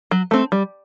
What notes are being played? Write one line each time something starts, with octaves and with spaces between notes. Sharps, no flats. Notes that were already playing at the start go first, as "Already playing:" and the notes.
F#3
A3 C4
G3